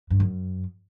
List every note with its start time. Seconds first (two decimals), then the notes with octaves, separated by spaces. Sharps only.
0.10 G2
0.20 F#2